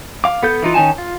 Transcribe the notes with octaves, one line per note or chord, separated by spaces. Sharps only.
F5 D6
B3 A4 G6
E3 D#4 F4
D#3 C#4 D#4 G#5 A5
F4